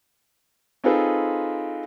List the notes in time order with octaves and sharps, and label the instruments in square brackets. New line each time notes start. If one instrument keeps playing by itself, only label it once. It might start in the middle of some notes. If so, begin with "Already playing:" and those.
[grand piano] C4 D#4 F4 G#4 A4 B4